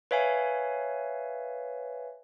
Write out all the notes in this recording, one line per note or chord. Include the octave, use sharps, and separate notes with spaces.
B4 C#5 E5 F5 G#5